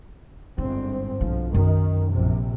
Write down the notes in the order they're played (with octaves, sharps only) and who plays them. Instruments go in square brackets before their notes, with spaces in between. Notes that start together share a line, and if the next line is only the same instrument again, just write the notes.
[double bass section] G1 G#2 C4 [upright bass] D4
[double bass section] B1 F3 [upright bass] D4
[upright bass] F#2 [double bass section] D#3
[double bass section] A#1 C3